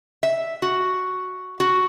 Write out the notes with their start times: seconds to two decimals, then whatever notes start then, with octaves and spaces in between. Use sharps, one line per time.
0.23 E5
0.62 F#4
1.60 F#4